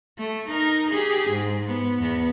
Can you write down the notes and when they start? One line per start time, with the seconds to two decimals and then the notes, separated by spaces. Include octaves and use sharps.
0.18 A3
0.48 D#4 A#4
0.91 G4 G#4
1.30 G#2
1.68 B3
2.00 E2 B3